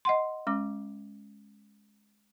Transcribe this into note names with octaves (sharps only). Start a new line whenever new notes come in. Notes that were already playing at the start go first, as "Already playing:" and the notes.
D#5 F#5 C6
G#3 C#4 D6